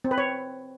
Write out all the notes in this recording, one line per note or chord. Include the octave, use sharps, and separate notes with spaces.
C4
B4
C#5